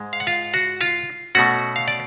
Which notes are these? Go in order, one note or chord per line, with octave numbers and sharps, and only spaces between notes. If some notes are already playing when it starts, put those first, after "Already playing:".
Already playing: G#2 G#3
F5
F#5
F4 F5
F#4 F#5
F4 F5
B2 A3 C#4 F#4 F#5
F5
D5